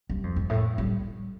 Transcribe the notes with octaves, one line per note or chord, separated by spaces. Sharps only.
G2
F2
G2
A2
G3